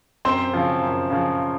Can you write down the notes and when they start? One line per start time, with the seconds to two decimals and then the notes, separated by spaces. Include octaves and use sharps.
0.25 F#2 C4 C5
0.54 C#3 F3
0.82 F#2
1.10 C#3 F3